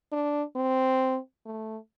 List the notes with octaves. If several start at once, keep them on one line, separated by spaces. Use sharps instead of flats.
D4
C4
A3